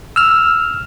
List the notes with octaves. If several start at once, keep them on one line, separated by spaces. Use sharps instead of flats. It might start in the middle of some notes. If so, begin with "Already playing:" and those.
E6 F6